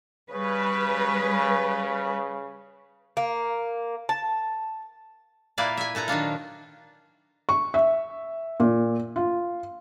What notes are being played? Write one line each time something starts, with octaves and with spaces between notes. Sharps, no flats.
C#3 G3 B4
A#3
A5
A#2 A#3 E4 B4 D5 F5
E5 G#5
A#2 A4 B4 A#5
D#3 F#3 D4 F4
C#6
E5
A#2
F4